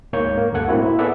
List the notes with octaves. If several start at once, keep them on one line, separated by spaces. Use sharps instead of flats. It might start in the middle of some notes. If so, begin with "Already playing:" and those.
D2 G#2 A#3 C#5 G6 G#6
A#3
D2 G2 A4 F#5 G#6
A2 A3 A#3 C4 E4 F#4
E4
B3 G#4 A4 D5 E5 F#5